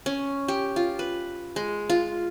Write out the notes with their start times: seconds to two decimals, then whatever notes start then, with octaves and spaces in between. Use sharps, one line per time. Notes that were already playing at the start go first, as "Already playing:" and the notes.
0.06 C#4
0.48 G4
0.76 F4
0.99 B4
1.56 G#3
1.90 F4